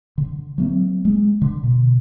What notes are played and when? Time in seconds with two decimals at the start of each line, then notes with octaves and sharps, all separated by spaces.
0.18 D3
0.58 F#3 A#3 C4
1.05 G#3
1.42 D3
1.63 B2